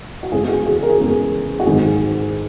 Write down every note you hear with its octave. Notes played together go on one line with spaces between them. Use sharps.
F#4
E2 C#3 G#3 B3 G#4
F#4
G#4
A#4
G#4
E2 C#3 G#3 B3 A#4
F#4
G#2 D#3 G#3 G#4